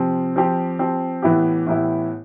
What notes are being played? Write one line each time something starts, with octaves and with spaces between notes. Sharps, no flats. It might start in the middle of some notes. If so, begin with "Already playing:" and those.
Already playing: C3 F3 C4
F3 C4 G4
F3 C4 G4
A2 E3 B3 E4 G4
A2 E3 B3 E4 G4